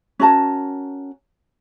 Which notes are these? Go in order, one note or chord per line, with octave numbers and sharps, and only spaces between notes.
C#4 F#4 A#4 A5